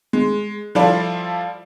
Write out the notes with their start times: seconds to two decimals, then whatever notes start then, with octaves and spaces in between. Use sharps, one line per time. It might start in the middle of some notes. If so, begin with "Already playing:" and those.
0.13 G#3
0.75 F3 G3 E4 F4 A4 D5